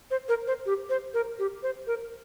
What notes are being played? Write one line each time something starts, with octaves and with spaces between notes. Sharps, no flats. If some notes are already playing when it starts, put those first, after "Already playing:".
C5
A#4
C5
G4
C5
A#4
G4
C5
A#4